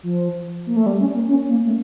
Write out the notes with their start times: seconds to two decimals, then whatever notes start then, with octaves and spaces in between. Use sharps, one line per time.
0.03 F3
0.67 A#3
0.76 A3
0.86 G3
1.00 C#4
1.15 A#3
1.29 C#4
1.49 A#3
1.66 A3